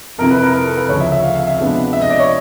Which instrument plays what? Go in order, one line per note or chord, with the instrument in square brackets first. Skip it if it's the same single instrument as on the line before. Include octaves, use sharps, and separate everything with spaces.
[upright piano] F2 C3 E3 A#4
B4
A#4
A#4
A4
B4
D2 C#3 F3 C#5
E5
E5
F5
F5
E5
C3 F3 G#3 B3 D4
E5
D#5
D5
C#5